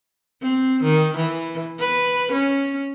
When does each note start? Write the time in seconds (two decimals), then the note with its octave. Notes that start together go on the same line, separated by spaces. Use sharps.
0.43 C4
0.83 D#3
1.17 E3
1.79 B4
2.32 C#4